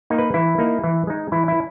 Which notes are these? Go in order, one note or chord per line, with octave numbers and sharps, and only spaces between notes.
A#3 D#4
B4
E3 E4
A#3 D#4
E3
G#3 D#4
E3 E4
E4